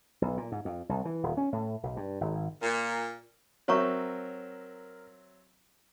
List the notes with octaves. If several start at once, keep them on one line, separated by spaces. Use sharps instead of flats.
B1
A#2
G#2
F2
C2
E3
D#1
C#4
A2
B1
G2
G#1
A#2
F#3 C4 A#4 C#5 E5 A#5 C#6